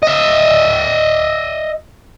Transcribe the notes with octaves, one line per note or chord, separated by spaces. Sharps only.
D#5 E5